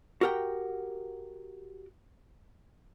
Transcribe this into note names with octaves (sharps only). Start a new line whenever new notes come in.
F#4 G4 A#4 F#5 G5